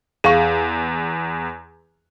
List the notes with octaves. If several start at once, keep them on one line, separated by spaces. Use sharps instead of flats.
E2 G#4 F5 C#6